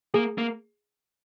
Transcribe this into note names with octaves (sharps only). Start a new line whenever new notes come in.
A#3 G#4
A#3